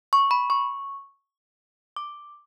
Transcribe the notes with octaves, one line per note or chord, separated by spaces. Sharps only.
C#6
B5
C#6
D6